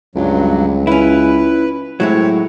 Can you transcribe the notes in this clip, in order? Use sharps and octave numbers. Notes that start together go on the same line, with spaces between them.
C#2 G2 F#3
C#4 E4 B4
A2 F#3 G#3 C4 E4 C#5